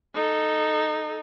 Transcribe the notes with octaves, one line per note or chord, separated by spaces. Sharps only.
D#4 A4